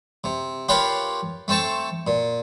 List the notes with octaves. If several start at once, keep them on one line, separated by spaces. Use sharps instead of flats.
C3
F4 G4 A#4 B4 C#5 C6
A3 C4 C5 A5 C#6
A#2